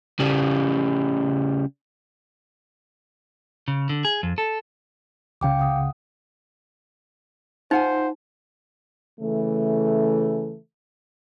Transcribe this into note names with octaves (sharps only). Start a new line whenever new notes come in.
C#3 G3
C#3
D3
G#4
F2
A4
C#2 C#3 F5 G5 D6
F#5 D#6
D#4 F4 C5 F#5 G#5
C#3 E3 A3